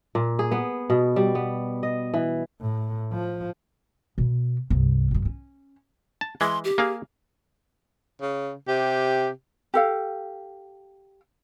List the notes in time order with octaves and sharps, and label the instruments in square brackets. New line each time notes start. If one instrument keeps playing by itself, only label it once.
[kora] A#2
G#4
B3
B2
G3
B3
D#5
E3
[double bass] A2
F3
[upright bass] B2 B3
C2 G2
G#1 F#2
C#4
[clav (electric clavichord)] A5
[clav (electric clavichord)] E3 G#3 [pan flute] C6
[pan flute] G4
[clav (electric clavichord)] A#3 G#4 F5
[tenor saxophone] C#3
[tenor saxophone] C3 [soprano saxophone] G4
[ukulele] G4 A4 F5